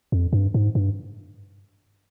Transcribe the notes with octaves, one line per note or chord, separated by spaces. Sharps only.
F2
G2
G#2
G2